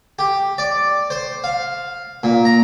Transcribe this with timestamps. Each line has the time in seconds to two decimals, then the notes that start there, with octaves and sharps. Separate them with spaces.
0.19 G4
0.58 D5
1.10 C5
1.44 F5
2.23 A#2
2.45 A#5